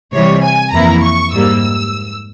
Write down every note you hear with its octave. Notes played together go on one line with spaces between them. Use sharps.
C3 E3 G3 C#5
G#5
F2 E3 A#3 E4 A#5
C#6
G#2 G3 A#3 E6